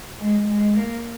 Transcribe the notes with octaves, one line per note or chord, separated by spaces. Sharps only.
G#3
G#3
A#3